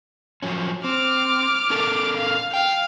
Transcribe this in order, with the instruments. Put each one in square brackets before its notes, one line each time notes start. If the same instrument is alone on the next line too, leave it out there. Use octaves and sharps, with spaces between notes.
[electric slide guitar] F3 F#3 C#4
[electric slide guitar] C4 [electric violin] D6 F6
[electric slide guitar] C#4 A4 A#4
[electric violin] F5
[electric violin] F5 [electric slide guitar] G5